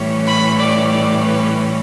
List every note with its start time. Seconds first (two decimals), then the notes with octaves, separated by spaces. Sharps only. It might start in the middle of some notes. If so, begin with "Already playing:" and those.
Already playing: A2 E3 G3 C#4
0.26 B5
0.58 D5
0.91 D5
1.25 B4